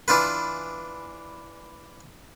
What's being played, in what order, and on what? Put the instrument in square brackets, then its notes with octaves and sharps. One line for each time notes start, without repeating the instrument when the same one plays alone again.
[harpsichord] E3 D4 F4 B4